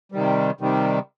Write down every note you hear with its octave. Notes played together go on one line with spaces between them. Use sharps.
C3 D#3 G3
C3 D#3 G3